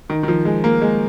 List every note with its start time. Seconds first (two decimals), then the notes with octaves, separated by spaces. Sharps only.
0.10 D#3
0.23 D#3
0.28 F3
0.45 G#3
0.64 A#3
0.82 G#3